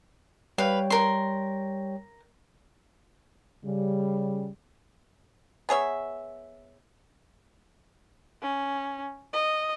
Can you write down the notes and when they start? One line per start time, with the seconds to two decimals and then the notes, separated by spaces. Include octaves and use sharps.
0.58 G3 B4 C#5 F5 G5
0.90 A#4 C6
3.64 C#3 G3
5.69 B3 G#4 C#5 E5
8.42 C#4
9.33 D#5